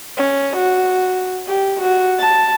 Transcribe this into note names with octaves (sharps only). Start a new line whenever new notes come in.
C#4
F#4
G4
F#4
A5